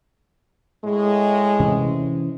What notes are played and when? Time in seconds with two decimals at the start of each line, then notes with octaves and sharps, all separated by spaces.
0.84 A2 G#3
1.60 C3 E3 C#4